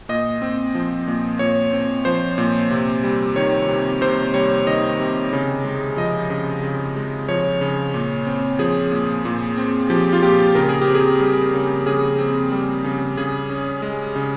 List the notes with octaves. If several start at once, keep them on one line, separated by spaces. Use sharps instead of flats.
A#2 D#5
C4
F3
A#2
A#2 C#5
C4
F3 C5
A#2
C3
G3
D#3 C#5
C3
C3 C5
G3 C#5
D#3 D#5
C3
C#3
G#3
F3 D#5
C#3
C#3
G#3
F3 C#5
C#3
A#2
C4
F3 G#4
A#2
A#2
C4
F3 G4
F4
A#2 G4
C#3 A#4
G#4
G4
C4
G#4
G3
C#3
C#3 G#4
C4
G3
C#3
C#3 G#4
C#4
G#3
C#3